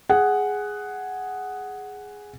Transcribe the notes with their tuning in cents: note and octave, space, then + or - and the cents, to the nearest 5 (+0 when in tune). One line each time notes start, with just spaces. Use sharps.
G#4 +0 F#5 +5